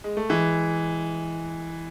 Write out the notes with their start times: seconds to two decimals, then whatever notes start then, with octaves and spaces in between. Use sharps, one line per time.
0.04 G#3
0.17 A3
0.29 E3 G#3